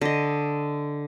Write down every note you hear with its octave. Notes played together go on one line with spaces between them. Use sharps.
D3 D#5